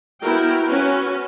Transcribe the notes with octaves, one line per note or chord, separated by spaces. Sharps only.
B3 E4 F#4 A#4 G5
C#4 F#4 B4